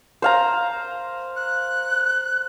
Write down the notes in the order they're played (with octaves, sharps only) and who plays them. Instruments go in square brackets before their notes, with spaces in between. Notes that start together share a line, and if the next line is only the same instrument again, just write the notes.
[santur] C5 F5 A#5
[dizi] F#6